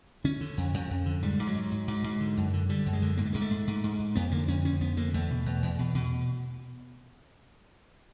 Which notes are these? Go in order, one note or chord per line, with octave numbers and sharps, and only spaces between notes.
D3 C#4
D3
F2
F2
F2
D3
G#2 G3
G#2
F#3
G#2
G#2
G#2
G#2
D3
F#2
D3
D3 G3
F#2
G#3
D3
G#2 A#3
A3
G#2 G#3
A3
G#2
G#2
G#2
G#2
F2 B3
D3 A#3
F2 C#4
D3 C#4
F2 B3
D3 A#3
E2 A3
B2
E2
E2
B2
B2